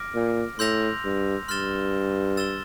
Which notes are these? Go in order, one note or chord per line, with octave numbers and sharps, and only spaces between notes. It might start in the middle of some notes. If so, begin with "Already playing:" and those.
Already playing: D6 F6 A#6 D7
A#2
A2 C6 E6 G6 A#6 F7
G2
G2 C6 F6 A6 E7 G7
E6 A6 E7 G7